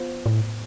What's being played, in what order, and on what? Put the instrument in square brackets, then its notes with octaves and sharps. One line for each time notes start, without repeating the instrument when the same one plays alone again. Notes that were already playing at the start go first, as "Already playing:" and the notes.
Already playing: [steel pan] B3 F4 C5
[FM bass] A2